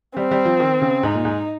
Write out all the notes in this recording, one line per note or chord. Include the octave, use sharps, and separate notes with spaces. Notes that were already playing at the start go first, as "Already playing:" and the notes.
G3 C4
G3
F3
D#3
C#3
G#2 D#4
A#2
G#2